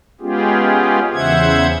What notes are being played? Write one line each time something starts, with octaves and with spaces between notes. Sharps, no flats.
G#3 B3 C#4 F4 G4 G#4
E2 C#3 C5 E5 F#5 G#6